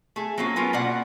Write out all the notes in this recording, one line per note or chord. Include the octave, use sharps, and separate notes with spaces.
A3 G#4
F#3 A#3 C4 C#4 F4
B3 C#4 F4 A#4
B2 A#3 D5 F#5